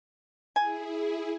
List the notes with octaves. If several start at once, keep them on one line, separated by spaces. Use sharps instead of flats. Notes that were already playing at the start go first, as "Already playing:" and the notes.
E4 G#4 G#5